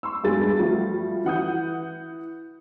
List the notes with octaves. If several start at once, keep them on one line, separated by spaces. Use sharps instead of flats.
C6 C#6 E6
E2 G2 G3 G#3 G#4 A6
F3 G3 A3 F4 F#4
E3 F#5 D#6 G6